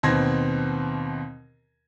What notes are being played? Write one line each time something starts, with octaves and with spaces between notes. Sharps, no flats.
D#2 B2 C4 C6 G#6 A#6